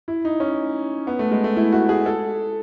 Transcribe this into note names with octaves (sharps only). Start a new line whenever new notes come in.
E4
D#4
C#4
B3
A3
G#3
A3
E4
F#4
G#4
A4